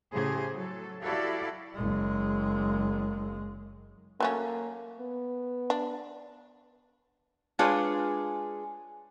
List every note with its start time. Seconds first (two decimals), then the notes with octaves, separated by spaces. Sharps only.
0.13 A2 C#3 G4 G#4 C5
0.53 F#3 A4
1.03 E4 F#4 G4 A4 D5 F5
1.75 F#1 G#3
4.20 F#3 A3 A#3 C#4
5.00 B3
5.70 D4
7.59 G#3 D4 F4 G#4 B4 C#5